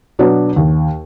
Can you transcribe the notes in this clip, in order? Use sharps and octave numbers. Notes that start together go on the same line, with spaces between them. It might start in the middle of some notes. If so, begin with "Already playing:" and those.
B2 F#3 B3 D4
D#2